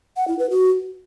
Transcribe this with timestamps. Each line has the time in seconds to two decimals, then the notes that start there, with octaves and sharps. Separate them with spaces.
0.16 F#5
0.28 E4
0.39 B4
0.50 F#4